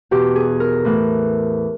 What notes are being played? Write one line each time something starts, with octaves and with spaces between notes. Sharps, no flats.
E2 B2 G4
G#4
A#4
A2 E3